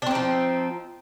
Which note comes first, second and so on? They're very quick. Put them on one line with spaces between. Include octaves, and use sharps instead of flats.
D4 C4 D#4 F3